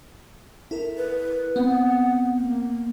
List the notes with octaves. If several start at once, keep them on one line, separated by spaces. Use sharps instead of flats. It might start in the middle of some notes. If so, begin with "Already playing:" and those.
E4 A4 A#4
B4
B3 C4 F#5
A#3